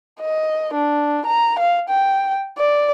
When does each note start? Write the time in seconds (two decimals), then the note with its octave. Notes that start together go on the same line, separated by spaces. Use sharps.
0.21 D#5
0.74 D4
1.26 A#5
1.59 F5
1.89 G5
2.58 D5